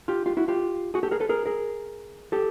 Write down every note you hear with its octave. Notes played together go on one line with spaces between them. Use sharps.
F4 G4
F4 G4
E4 F#4
F4 G4
F#4 G#4
G4 A4
G#4 A#4
A4 B4
G#4 A#4
G#4 A#4
G4 A4